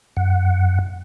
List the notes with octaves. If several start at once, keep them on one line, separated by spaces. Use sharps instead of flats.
F#2 F#5